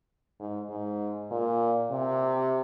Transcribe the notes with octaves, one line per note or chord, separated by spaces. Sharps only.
G#2
G#2
A#2
C3